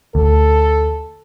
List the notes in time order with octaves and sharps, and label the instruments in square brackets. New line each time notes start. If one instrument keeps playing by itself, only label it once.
[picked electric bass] D2 [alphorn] A4